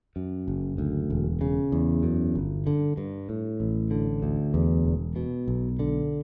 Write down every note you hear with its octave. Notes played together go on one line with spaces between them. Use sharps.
F#2
F#1
D2
E1
C#3
E2
F#2
G1
D3
G2
A2
A1
D3
D2
E2
E1
B2
B1
D3